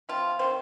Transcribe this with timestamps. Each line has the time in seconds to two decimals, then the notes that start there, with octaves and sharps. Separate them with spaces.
0.09 F3 C4 F4
0.39 D#3 A3 C4 C5